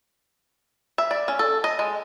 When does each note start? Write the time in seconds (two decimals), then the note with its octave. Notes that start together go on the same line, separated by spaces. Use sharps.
0.98 E5
1.11 D5
1.28 C#4
1.39 A4
1.64 D#5
1.79 G#3